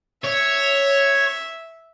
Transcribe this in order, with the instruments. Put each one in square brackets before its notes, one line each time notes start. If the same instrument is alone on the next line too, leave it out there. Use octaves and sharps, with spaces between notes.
[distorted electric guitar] C#5 [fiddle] E5